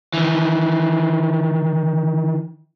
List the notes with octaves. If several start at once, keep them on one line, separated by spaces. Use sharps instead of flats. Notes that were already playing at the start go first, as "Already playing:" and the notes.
D#3 E3